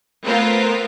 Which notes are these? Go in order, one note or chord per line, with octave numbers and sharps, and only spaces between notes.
A3 B3 C4 F4 A#4